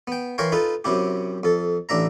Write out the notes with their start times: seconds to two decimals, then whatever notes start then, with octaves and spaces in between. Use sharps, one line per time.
0.07 B3 G5
0.38 E3 A#4 C#5 F5 G5 C6
0.52 D#4 F4 A4 B4
0.84 F#2 C3 E4 G4
1.43 F2 A4
1.89 A1 D4 E5 A#5